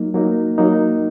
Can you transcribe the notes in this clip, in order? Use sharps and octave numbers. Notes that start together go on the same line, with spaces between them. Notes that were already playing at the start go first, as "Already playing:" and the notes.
Already playing: F#3 A#3 D#4
F#3 A#3 D#4
F#3 A#3 D#4